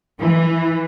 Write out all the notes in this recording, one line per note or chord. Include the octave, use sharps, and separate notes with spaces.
E3